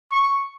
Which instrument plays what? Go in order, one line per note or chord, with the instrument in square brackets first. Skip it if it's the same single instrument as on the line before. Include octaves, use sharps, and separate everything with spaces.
[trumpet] C#6